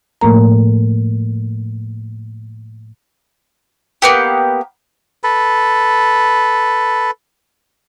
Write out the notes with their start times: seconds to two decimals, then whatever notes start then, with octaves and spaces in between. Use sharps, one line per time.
0.21 A2 F3 A3 A#3 A#4 A#5
4.02 A#3 B3 G4
5.23 A4 B4